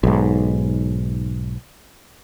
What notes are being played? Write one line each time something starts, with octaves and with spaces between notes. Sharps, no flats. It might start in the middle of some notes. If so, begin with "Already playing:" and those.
B1 G#2